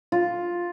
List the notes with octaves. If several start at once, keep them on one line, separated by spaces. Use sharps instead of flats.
F4